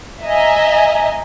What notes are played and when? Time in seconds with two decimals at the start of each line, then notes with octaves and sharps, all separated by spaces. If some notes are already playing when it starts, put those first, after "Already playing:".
0.24 D#5 E5 G#5 A#5